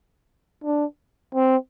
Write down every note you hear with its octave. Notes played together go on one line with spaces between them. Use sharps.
D4
C4